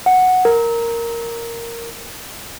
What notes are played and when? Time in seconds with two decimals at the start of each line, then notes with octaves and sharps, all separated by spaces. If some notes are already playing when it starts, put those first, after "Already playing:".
0.06 F#5
0.45 A#4